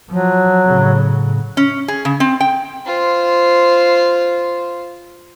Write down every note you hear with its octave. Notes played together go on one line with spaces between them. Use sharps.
F3 F#3
A2 C#3
C#4
G#4
C#3
C4
G5
F4 C5